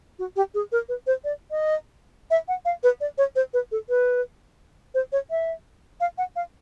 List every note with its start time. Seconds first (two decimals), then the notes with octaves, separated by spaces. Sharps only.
0.19 F#4
0.36 G4
0.54 G#4
0.72 A#4
0.89 B4
1.07 C5
1.24 D5
1.51 D#5
2.30 E5
2.48 F#5
2.65 F5
2.83 B4
3.01 D5
3.18 C#5
3.36 C5
3.53 B4
3.71 A4
3.89 B4
4.94 C5
5.12 C#5
5.31 E5
6.00 F5
6.18 F#5
6.36 F5